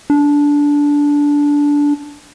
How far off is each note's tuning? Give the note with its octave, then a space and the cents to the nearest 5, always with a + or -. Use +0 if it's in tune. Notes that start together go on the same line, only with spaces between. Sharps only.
D4 -15